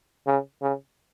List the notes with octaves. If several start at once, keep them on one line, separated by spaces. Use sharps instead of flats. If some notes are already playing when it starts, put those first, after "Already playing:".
C#3
C#3